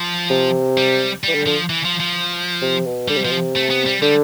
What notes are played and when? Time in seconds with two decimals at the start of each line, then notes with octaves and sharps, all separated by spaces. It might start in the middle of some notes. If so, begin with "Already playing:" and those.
Already playing: F3
0.30 C3
0.77 G3
1.24 E3 G3
1.35 D3
1.46 D3 F3
1.70 E3
1.85 F3
2.00 F3
2.62 C3
2.86 B2
3.08 D3 G3
3.16 C3
3.24 B2 F3
3.31 C3
3.56 A3
3.70 B3
3.86 G3
4.02 D3 G3